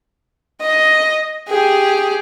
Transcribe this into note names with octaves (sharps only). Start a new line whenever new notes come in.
D#5
G4 G#4